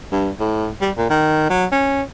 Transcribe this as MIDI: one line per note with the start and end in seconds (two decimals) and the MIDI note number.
0.12 0.29 43
0.40 0.70 45
0.81 0.91 55
0.97 1.07 46
1.10 1.47 51
1.50 1.65 54
1.72 2.02 61